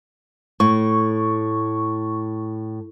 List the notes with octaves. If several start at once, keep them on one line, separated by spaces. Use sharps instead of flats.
A2 C#6